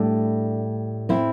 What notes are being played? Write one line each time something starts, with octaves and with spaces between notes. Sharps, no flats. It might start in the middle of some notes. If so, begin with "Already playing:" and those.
Already playing: A2 G3 A3 D4
C4 E4